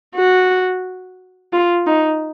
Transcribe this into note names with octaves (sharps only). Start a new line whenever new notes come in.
F#4
F4
D#4